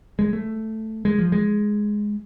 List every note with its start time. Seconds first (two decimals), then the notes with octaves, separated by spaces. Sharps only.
0.19 G#3
0.33 A3
1.05 G#3
1.18 F3
1.32 G#3